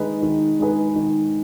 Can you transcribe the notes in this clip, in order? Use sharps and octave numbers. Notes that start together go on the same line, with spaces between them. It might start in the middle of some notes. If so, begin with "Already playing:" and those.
Already playing: D#3 G#3 D#4 G#4 B4
D#3
G#3 D#4 G#4 B4
D#3